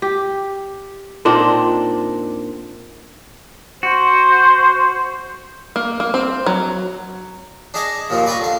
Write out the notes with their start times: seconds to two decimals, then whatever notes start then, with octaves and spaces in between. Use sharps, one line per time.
0.02 G4
1.25 A#2 C4 D4 D#4
3.83 F#4 C5
5.76 A#3
6.00 A#3
6.14 C4
6.46 F#3
7.74 D4 D#4 G#4 E5 A#5 D6
8.10 D#2 A#2 D#3 F3 A#3
8.26 B4 D5 G5 A#5 C#6
8.41 D3 F5